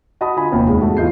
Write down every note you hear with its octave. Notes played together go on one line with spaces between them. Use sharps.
F#4 D#5 A5 B5 D#6
D3 F4 G#5 B5
F1 D#2 B3
G#2 G#3
E2 A3 F#4
E3 F4 D#5 G6 C7